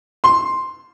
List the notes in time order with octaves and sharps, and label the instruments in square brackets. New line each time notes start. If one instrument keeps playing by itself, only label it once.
[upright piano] C6